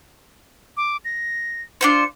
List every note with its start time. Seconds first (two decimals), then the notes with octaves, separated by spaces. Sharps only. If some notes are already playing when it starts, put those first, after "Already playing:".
0.77 D6
1.05 A#6
1.81 D4 F4 C5 C#7